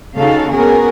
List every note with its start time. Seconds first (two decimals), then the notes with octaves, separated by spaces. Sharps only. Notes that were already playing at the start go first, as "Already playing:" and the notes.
0.17 C#3 D#4 F#4 A4 F5
0.52 B3 C#4 F#4 G#4 A#4